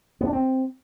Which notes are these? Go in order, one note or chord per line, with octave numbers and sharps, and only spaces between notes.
B3
D4
C4